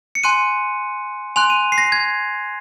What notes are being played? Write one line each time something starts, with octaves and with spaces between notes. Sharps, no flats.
C#7
G#5 C6 F#6 D#7
G#5 C6 F#6 F7
D#7
C7
A#6
G#6